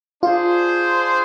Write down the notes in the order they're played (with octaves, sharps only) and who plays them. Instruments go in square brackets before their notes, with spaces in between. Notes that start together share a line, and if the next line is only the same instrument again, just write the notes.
[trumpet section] D4 G#4 C5 [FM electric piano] F4